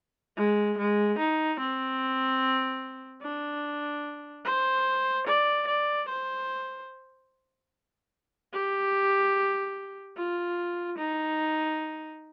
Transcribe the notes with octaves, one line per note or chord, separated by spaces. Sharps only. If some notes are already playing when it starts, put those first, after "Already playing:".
G#3
G#3
D#4
C4
D4
C5
D5
D5
C5
G4
F4
D#4